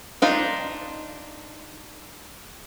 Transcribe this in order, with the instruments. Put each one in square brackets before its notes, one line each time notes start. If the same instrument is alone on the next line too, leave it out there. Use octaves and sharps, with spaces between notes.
[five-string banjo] D4 D#4 F4